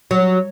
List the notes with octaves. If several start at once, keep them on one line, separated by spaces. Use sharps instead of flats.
F#3